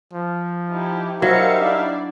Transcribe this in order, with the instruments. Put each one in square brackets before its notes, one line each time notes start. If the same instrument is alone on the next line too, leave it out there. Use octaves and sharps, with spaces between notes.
[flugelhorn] F3
[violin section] D#4 E4 G4
[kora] F#3 [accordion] G3 E5 F5 [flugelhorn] D#4 [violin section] A#4 C5 C#7
[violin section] D4 E4 D5